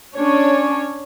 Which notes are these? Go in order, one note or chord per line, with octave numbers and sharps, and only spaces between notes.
C#4 D4 C#5